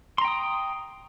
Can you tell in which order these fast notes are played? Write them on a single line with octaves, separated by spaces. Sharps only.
C6 A#5 G5 D#6